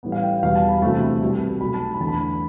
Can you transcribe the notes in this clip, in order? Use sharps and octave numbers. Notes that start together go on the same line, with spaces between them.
A1 A2 G3 B3
F5
G5
E1 E2 B2 G3 B3 F5
A5
B5
D2 C3 E3 A3 A5
C2 B2 G3
B1 B2 A3 B5
A5
B5
E2 D3 A3 A5
B5